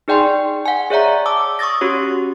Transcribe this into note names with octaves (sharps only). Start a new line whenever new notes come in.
D#4 G#4 D5 G5 G#5 C6
F#5 G#5
G#4 C#5 D5 E5 F#5 A#5
A5 D6 E6
C#6 D#6 E6 A6 A#6
C#4 F#4 G4 C#5